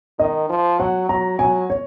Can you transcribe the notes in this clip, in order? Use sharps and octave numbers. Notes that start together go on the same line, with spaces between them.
D#3 D#5
F3
F#3 F#5
F#3 A#5
F#3 G#5
C#5